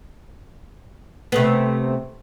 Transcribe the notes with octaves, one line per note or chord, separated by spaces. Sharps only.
C3 A3 B3